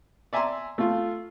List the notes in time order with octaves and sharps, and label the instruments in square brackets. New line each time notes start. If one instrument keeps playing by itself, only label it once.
[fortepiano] D5 E5 G#5 A#5 C6
A3 F4